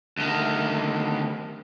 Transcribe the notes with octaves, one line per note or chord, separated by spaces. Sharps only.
D2 D#3